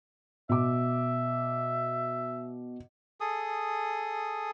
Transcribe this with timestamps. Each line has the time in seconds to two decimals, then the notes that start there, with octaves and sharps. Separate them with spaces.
0.49 B2 E5 D6
3.21 G#4 A4 D#6